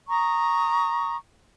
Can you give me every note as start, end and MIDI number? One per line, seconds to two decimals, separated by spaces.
0.09 1.16 82
0.09 1.16 85
0.09 1.16 87